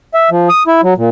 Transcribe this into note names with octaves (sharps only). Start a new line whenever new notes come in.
E5
F3
D#6
E4
F#3
A#2